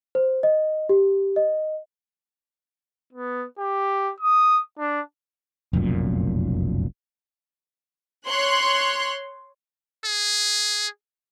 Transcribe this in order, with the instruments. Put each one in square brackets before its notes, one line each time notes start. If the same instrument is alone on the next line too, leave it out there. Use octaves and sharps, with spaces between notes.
[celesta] C5
D#5
G4
D#5
[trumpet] B3
G4
D#6
D4
[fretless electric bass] F1 B1 F#2 A#2
[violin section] C#5 C6 F#6
[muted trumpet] G#4